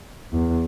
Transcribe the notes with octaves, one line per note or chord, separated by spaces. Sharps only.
E2